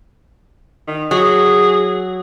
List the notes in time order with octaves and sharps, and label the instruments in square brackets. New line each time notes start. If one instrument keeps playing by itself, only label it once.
[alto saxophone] D#3
[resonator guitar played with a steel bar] F#3 [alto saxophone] G#4